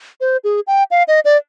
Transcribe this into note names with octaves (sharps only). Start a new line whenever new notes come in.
C5
G#4
G5
F5
D#5
D5